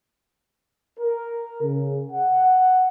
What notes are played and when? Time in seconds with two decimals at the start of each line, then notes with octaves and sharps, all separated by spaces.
0.99 A#4
1.62 C#3
2.10 F#5